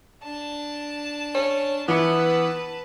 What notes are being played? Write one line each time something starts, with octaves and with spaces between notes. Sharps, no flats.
D4 A5
C#4
E3 B3 E4 B4 A5 C#7